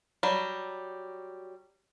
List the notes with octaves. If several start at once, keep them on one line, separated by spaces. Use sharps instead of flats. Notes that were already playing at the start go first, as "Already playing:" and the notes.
F#3 G3